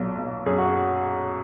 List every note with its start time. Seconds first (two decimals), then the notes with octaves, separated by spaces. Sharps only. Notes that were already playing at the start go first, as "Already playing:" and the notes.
Already playing: B1 A#2 F#3
0.18 B1
0.46 F#2 G#4
0.58 F#4